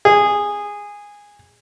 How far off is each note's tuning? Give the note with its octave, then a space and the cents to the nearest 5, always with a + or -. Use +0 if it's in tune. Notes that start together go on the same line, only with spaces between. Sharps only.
G#4 -15